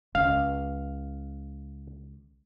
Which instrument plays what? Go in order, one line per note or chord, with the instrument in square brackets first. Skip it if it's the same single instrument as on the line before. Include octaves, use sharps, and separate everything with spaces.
[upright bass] C#2 [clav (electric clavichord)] F5